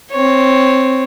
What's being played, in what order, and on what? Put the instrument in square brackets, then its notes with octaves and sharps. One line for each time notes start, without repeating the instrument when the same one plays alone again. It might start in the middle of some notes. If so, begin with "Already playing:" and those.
[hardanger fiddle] C4 C#5